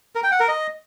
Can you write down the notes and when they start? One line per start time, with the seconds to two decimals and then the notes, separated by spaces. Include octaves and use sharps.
0.15 A#4
0.24 G5
0.32 F#5
0.40 A#4
0.48 D#5